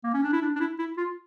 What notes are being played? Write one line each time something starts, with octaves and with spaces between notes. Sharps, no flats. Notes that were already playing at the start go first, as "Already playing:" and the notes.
A#3
C#4
D4
E4
D4
D4
E4
E4
F4